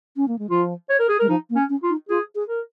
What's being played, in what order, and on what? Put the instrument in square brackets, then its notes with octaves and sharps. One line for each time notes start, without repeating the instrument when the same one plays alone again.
[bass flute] C#4
A#3
G#3
[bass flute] F3 [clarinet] F4
[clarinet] C#5
A#4
G#4
[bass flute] G#3 [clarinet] A#4
[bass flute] F3 [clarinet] D#4
[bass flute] A#3
[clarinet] C#4
[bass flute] C#4
[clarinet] F4
[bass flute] D#4
[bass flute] F4 [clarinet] G#4
[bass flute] G#4
[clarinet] A#4